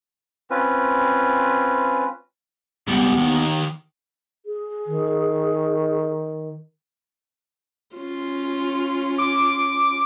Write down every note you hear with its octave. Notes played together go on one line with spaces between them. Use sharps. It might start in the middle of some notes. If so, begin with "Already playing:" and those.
C4 C#4 F4 B4
C#2 G3 B3
D#2 D#3
G#4
D#3
C#4 F4
D6